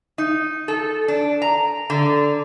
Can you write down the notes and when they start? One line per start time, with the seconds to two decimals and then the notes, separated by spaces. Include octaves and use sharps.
0.18 D#4
0.68 A4
1.08 D4
1.42 A#5
1.90 D3